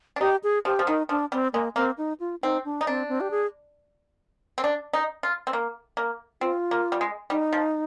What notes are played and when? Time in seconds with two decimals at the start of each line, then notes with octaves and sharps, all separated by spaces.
0.16 D4
0.21 D#4 G4
0.43 G#4
0.65 F3 G4
0.79 F3
0.87 D#3 D#4
1.09 F3 D4
1.32 G3 C4
1.53 G#3 A#3
1.76 A#3 C4
1.98 D#4
2.20 F4
2.43 C4 D#4
2.65 D4
2.81 D#4
2.87 C4 D4
3.09 C4
3.21 G4
3.31 G#4
4.58 C4
4.64 D4
4.93 D#4
5.23 F4
5.47 C4
5.53 A#3
5.97 A#3
6.41 C4 F4
6.71 A#3
6.92 G3
7.01 G#3
7.30 G3 D#4
7.53 F3